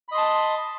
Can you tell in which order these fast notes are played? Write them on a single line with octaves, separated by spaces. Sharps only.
B5 D#5 C6 A5